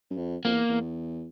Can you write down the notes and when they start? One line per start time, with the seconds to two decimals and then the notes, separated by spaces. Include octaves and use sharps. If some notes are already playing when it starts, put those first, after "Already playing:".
0.11 F#2
0.17 F2
0.45 F2 A#3
0.53 E2
0.69 E2